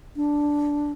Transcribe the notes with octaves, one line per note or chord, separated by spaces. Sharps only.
D4